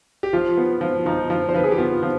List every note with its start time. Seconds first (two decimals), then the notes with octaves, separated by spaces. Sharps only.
0.23 G4
0.33 F3 F4
0.57 B3
0.81 F3
1.06 F3 D#4
1.30 F3
1.49 C5
1.54 F3 B4
1.64 G#4
1.72 G4
1.78 B3 F4
2.03 F3